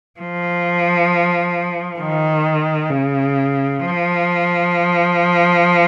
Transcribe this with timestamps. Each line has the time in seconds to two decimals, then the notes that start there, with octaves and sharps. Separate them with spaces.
0.20 F3
2.00 D#3
2.90 C#3
3.79 F3